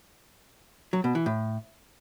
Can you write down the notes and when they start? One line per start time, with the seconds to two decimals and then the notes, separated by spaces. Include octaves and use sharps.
0.93 F#3
1.04 B2
1.15 E3
1.26 A2